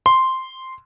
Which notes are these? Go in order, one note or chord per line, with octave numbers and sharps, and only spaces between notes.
C6